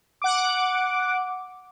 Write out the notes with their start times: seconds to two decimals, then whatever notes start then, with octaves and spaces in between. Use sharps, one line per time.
0.22 F#5 D6